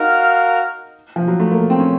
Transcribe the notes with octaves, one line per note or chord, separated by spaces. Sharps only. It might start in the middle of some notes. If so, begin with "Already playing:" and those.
Already playing: D#4 F#4 A#4 F5
F3
F#3
A3
A#3
C4
C#4